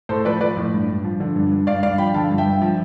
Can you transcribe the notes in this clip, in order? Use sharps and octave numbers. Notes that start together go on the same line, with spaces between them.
A2 A4 C5
F3 B4 D5
F3 B4 D5
A2
G2
G2
F3
D3
G2
G2
G2 D5 F5
G2 D5 F5
F3 G5 B5
D3 F5 A5
G2
E5 G5
G2
F3